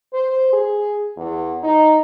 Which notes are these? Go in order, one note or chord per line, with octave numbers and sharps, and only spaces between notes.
C5
G#4
E2
D#4